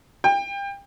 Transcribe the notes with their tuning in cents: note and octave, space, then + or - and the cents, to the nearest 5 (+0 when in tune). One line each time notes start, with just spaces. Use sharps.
G5 +30